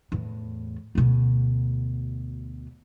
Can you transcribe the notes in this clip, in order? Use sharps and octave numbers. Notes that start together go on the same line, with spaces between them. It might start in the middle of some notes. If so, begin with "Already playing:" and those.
E2 A2
D2 B2